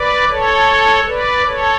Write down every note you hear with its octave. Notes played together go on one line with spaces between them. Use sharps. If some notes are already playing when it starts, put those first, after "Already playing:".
Already playing: B4 D5
A4 C#5
B4 D5
A4 C#5